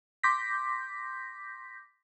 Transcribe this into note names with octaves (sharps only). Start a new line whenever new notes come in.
C6 D6 G6 A#6 B6